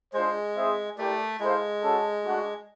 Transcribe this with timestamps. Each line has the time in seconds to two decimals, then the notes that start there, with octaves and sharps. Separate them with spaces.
0.13 G#3 D4 F4 G#4 C5
0.55 C4 E4 G#4 C5 E5
0.98 A3 E4 G4 A#4 D5
1.40 G#3 E4 A4 C5 F5
1.82 C#4 F#4 A4
2.25 A3 D4 F#4